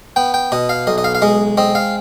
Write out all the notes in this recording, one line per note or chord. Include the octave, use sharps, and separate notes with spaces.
B3 G5
G5
B2 D#5
F5
B1 D#5
D#5
F5
F5
G#3 D#5
C4 D#5
F5